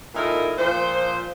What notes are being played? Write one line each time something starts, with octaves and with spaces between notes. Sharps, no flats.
A#2 D#4 E4 A4 A#4
A#2 F3 C5